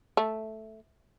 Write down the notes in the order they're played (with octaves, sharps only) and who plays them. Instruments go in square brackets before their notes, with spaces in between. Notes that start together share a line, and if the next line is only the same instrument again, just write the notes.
[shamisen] A3